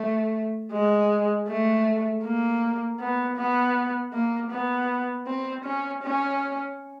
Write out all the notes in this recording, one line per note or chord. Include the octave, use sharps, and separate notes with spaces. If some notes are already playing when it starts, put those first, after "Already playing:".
Already playing: A3
G#3
A3
A#3
B3
B3
A#3
B3
C4
C#4
C#4